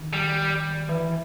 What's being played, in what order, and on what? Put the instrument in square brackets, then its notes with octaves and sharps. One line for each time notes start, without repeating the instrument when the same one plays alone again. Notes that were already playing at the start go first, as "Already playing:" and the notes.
Already playing: [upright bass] D#3
[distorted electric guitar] G3
[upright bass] E3